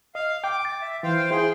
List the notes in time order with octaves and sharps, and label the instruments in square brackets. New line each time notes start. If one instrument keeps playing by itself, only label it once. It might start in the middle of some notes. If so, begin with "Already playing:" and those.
[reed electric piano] D#5 [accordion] F5
[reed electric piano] G5 [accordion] D6
[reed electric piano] A6
[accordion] E5
[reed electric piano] E3 [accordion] C5 F5 G5
[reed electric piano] E4 C5 [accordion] G#4 G5 C6